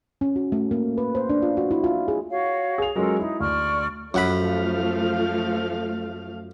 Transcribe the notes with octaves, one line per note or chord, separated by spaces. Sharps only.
C#4
F#4
A3
A#3
B4
C5
D4
F4
F#4
E4
F4
G#4
F#4 C#5 F5
G#4 F7
F#3 G#3 C#4 F4 A4 A#4
D#4 E4
D2 D5 C#6 F6
F#2 F3 A3 F5 F#5 B5